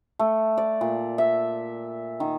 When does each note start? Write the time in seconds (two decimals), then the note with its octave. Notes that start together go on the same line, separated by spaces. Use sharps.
0.19 A3
0.58 D5
0.81 A#2
1.18 E5
2.20 D#3